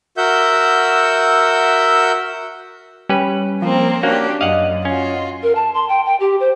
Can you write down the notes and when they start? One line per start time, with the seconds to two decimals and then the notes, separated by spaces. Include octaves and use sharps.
0.17 F#4 A#4 E5 F#5 E6 G6
3.09 G3 C#4 B4
3.62 F3 A#3 C4 A#4
4.03 A#3 C#4 D4 F#4 G4
4.41 F#2 D#5 F5 F#5
4.85 C#4 F4 F#4
5.43 A#4
5.55 A5
5.74 C6
5.89 G5
6.05 G5
6.20 G4
6.40 C5